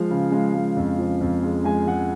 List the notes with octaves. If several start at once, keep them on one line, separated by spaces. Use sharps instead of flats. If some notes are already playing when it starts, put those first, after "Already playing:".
Already playing: F3 G#3 F5
C#3
G#3
G#3
F2
F3
F2
G#3
G#3 G#5
G#3 F#5